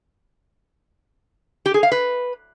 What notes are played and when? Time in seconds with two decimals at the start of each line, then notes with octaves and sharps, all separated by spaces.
1.66 G4
1.74 G#4
1.83 F5
1.92 B4